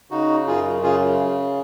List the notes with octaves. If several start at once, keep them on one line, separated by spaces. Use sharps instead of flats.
C#3 D#4 F#4
F#2 F4 G#4
C#3 F4 G#4